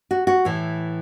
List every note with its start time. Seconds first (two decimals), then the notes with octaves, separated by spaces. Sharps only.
0.11 F#4
0.27 F#4
0.45 A2 E3